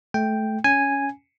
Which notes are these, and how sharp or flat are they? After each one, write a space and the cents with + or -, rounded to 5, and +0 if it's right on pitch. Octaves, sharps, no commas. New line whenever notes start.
A3 -20 G5 +0
C#4 +10 G#5 -5